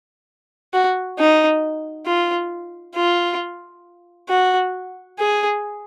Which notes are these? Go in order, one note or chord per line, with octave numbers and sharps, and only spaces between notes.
F#4
D#4
F4
F4
F#4
G#4